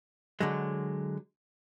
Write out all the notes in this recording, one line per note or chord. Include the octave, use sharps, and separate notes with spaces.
D3 F#3 G#3